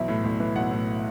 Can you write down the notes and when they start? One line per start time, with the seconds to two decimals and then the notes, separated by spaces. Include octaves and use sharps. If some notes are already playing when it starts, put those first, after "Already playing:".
Already playing: B1 E3 E5
0.08 A2
0.23 B1
0.40 E3
0.56 B1 F#5
0.71 A2